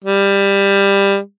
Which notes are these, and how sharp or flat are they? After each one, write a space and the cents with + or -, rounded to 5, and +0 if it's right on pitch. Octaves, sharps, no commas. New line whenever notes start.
G3 +15